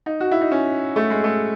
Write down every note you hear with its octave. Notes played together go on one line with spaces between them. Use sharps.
D#4
F#4
E4
D#4
C#4
A3
G#3
A3